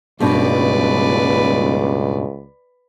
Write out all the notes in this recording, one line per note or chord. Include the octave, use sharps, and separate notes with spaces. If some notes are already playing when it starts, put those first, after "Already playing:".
D#1 C#2 G2 B2 D4 B4 D5